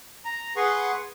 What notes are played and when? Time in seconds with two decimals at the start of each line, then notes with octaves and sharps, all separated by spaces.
0.25 A#5
0.56 G#4 B4 F#5 C6 C#6